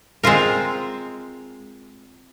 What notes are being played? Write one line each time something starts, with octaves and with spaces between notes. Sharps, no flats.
G#3 C4 F4 A#4